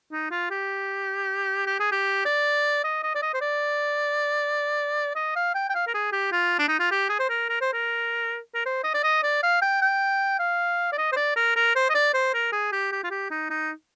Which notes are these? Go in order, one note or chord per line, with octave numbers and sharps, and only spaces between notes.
D#4
F4
G4
G4
G#4
G4
D5
D#5
D#5
D5
D#5
C5
D5
D#5
F5
G5
G5
F5
A#4
G#4
G4
F4
D4
D#4
F4
G4
G#4
C5
A#4
A#4
C5
A#4
A#4
C5
D#5
D5
D#5
D5
F5
G5
G5
F5
D5
D#5
C5
D5
A#4
A#4
C5
D#5
D5
C5
A#4
G#4
G4
G4
F4
G4
D#4
D#4